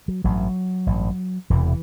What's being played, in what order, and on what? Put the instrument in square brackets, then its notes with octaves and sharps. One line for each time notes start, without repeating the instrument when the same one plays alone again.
[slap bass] F#3
A1 G2 F#3
A1 G2
E1 E2 C3 E3